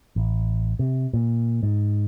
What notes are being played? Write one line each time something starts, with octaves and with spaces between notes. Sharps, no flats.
A1
C3
A#2
G#2